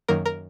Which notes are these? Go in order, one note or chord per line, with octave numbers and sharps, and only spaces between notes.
F#2 D#3 F#3 A#3 A#4
A#4